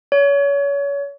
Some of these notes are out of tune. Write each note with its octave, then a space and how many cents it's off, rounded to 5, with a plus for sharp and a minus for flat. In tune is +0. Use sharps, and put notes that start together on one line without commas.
C#5 +30